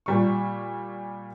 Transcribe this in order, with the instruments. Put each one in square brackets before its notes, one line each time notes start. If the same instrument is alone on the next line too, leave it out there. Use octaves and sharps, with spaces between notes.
[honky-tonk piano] A#2 G3 C#6